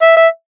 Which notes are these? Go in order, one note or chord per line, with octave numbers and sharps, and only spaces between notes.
E5
E5